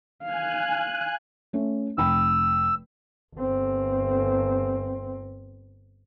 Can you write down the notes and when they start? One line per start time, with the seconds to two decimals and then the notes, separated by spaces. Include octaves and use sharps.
0.23 F5 G#5 F#6
1.53 A3 C#4
1.98 F1 G5 B5 E6
3.35 G1 C4